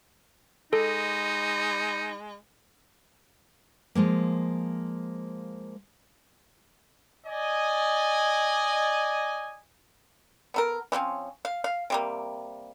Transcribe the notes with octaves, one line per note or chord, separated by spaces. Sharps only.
G#3 D#4 A4
F3 G#3 A#3
D5 D#5 G#5
B3 A4 A#4
E3 F3 C4 C#4
F5
F5
C3 G3 A#3